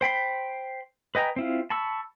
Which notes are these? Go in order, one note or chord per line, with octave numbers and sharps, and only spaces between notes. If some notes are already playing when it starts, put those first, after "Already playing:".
C5 G5 B5 C6
B4 D#5 G5 G#5 A#5
C4 E4 F4
A5 B5 C#6 E6